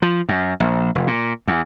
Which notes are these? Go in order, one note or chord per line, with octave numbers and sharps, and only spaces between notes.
F3
F#2
A#1
F1
A#2
E2